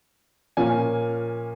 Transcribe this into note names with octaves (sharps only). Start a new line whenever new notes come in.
A#2 F3 A#3 C#4 G#5